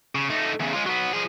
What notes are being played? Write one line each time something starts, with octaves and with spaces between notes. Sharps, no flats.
C#3
A3 D#4
E2 C#3
G#3 F4
F#3 B3
F3 G#4